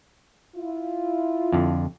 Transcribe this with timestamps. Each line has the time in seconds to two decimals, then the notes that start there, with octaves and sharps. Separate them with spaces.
0.56 E4 F4
1.52 F2 D3